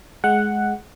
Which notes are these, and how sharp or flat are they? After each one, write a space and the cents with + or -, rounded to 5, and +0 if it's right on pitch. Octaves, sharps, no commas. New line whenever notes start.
G#3 +15 F#5 +0